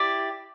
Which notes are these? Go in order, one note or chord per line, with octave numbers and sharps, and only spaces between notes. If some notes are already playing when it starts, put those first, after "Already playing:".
Already playing: E4 G4 D5